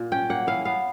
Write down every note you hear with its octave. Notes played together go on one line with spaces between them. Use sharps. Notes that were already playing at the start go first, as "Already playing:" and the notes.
Already playing: A#2 A#3
C#4 G5
A#3 F#5
E3 F5
B3 F5